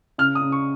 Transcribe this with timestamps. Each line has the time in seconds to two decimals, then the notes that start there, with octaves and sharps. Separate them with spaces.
0.18 C#3 F6
0.35 D#6
0.41 C#3
0.52 C#6